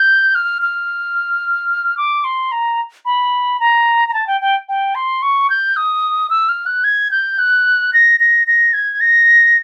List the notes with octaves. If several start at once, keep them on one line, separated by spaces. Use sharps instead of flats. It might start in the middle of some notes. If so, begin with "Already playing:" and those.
Already playing: G6
F6
F6
D6
C6
A#5
B5
A#5
A#5
A5
G5
G5
G5
C6
C#6
G6
D#6
E6
F6
F#6
G#6
G6
F#6
A#6
A#6
A#6
G#6
A#6